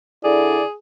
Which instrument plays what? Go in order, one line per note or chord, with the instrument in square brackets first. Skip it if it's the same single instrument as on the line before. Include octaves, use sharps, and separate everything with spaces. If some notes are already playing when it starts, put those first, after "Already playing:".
[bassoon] D3 [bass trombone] E4 [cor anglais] G#4 [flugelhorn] D5